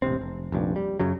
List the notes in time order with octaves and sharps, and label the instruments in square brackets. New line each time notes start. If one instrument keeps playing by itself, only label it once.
[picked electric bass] E1 A1 C3 C4
F1
F1 A#1 G2
G3
F#2 C#3 F#3